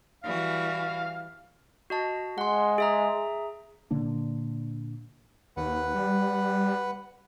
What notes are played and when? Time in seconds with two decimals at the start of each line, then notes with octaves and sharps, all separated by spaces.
0.24 E3 G3 F#4 F5
1.90 F#4 D#5 A5
2.38 G#3 F#5 C6
2.78 G#4 E5 A#5
3.91 A#2 D3 A#3 D4
5.57 D#2 B4 F#5
5.95 G3